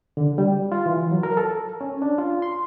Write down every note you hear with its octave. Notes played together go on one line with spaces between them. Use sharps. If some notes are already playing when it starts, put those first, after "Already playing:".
D3
G3
F4
E3
F#3
A#4
A4
C#4
D4
F4
C6